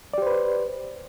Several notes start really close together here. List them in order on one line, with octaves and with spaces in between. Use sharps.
D5 G4 C5 B4